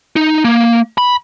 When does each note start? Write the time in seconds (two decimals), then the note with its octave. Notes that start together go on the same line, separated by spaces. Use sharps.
0.16 D#4
0.45 A#3
0.98 B5